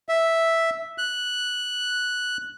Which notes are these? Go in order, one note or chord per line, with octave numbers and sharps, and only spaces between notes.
E5
F#6